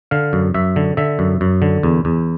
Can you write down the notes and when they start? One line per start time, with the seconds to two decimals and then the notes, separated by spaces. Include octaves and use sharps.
0.11 D3 F5
0.33 F#2
0.54 F#2 E5
0.76 D3
0.97 D3 E5
1.19 F#2
1.41 F#2
1.62 D3
1.83 E2
2.05 E2